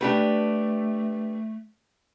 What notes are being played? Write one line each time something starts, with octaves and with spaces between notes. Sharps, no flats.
A3 D4 G4 B4